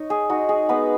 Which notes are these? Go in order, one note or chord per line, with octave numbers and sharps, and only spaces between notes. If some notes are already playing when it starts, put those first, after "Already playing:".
Already playing: D#4 C#5
G#4
G#3 D#4 F#4
G#4
G#3 B3 D#4 B4